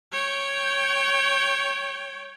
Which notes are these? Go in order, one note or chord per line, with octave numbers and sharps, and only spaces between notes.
C#5 G5